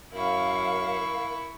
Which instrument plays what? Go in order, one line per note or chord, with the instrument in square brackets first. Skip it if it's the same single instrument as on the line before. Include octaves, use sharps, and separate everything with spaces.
[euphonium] F#2 [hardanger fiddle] E4 C#6 [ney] A#4 [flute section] F5